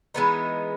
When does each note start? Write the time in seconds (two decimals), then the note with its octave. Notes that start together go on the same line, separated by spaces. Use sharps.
0.14 E3 G#3 B3 D#4